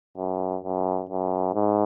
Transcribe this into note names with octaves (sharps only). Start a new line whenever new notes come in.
F#2
F#2
F#2
G#2